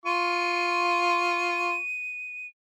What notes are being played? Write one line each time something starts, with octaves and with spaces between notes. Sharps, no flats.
F4 C#6 D#7